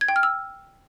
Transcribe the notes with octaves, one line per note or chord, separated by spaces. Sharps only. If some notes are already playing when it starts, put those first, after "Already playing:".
G#6
G5
F6
E6